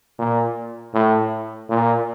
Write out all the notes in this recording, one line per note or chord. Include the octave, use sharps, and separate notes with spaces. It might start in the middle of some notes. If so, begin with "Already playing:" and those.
A#2
A2
A#2